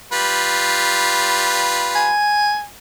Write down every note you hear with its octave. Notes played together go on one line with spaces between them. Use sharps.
G3 F4 B4
G#5